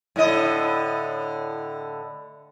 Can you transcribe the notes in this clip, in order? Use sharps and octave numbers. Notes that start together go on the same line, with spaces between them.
A2 D3 D#5